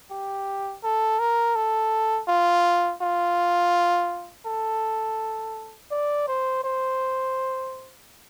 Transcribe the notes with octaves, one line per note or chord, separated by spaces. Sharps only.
G4
A4
A#4
A4
F4
F4
A4
D5
C5
C5